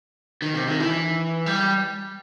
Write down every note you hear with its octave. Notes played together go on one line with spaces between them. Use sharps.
D#3
C3
D#3
E3
G3